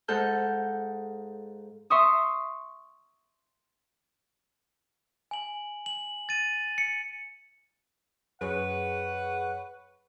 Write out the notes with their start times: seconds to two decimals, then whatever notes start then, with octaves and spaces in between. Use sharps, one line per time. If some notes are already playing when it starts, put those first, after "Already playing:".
0.08 G#2 A4 F5 F#5 G6
1.90 E5 C6 C#6 D#6
5.31 G#5 F#7
5.86 F#7
6.29 A6 D#7
6.78 C#7
8.41 F#2 G#4 B4 C#5 F#5 C#6